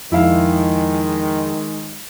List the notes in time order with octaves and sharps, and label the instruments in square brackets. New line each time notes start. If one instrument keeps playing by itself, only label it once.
[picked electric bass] F2 [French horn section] D#3 G#3 [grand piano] E4 F5